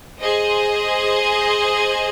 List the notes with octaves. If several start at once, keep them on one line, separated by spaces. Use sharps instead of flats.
G#4 C5 D#5